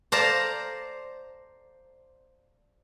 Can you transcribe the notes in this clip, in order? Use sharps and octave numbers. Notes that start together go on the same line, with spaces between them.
C5 D5 F5 A5 A#5